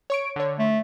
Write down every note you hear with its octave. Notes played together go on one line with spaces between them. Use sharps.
C#5 C#6 D7
D3 C#5
A3